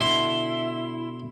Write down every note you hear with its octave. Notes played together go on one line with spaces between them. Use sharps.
B2 D3 E4 C6